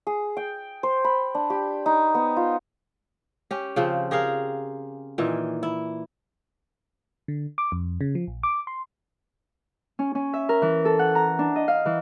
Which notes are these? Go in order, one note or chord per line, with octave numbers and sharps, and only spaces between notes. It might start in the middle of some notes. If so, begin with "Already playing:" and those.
G#4
G5
C5
B5
D4
G4
D#4
B3
F4
C#4 G4
C#3 F3 C4
G4 G#4 A#4 F5
A#2 D#3 E3
E4
D3
D6
F2
C#3
F3
A#1
D6
C6
C#4
C#4
E5
A#4
E3
A4
F#5
A#5
D4
D#5
F5
E3